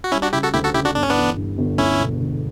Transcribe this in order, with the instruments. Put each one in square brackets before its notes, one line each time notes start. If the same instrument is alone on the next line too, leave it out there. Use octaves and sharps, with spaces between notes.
[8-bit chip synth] F#4
[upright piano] G3 [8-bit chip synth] C#4 E4
[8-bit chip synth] D4 F#4
[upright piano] C#3 [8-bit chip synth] E4 G4
[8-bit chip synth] F#4 A4
[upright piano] D2 [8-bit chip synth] E4 G4
[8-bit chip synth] F#4 A4
[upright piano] C#3 [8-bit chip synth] E4 G4
[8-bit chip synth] D4 F#4
[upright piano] G1 [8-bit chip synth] D4
[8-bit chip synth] C#4
B3 D4
[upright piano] E3
G2
G1
[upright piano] D2 [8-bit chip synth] C#4 E4
[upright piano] E1
D3